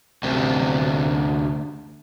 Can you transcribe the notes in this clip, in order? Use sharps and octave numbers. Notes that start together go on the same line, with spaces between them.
D2 C3